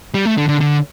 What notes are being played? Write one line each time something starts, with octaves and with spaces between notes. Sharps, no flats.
G3
A3
D3
D3
D3